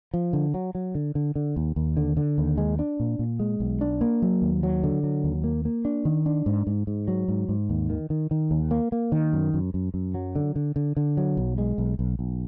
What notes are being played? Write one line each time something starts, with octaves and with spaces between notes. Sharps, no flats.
F3
D3
F#3
F#3
D3
D3
D3
D#2
D#2
D3
D3
D#2
G#3
D4
A#2
A#2
G#3
B1
D4
A#3
F#3
D#2
F#3
D3
F#3
D#2
A#3
A#3
D4
D#3
D4
G#2
G#2
G#2
F#3
G#2
G#2
D#2
D#3
D#3
D#3
D#2
A#3
A#3
D#3
F#2
F#2
F#2
F#2
F#3
D3
D3
D3
D3
F#3
B1
G#3
B1
B1
B1